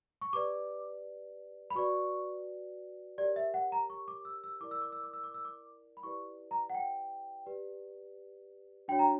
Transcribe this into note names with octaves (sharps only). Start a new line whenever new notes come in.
C#6
G4 B4 D5 D6
B5
F#4 B4 D5 C#6
G4 A#4 C#5 D5
E5
F#5
A#5
C#6
D6
E6
E6
E4 A#4 D5 D6
E6
D6
E6
D6
E6
D6
E6
D6
B5
E4 G4 B4 D5 C#6
A#5
F#5
G5
G4 B4 D5
D4 F#4 C#5 G5
A#5